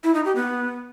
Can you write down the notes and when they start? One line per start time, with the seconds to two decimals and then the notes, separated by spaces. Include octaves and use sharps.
0.04 E4
0.14 D#4
0.25 G4
0.36 B3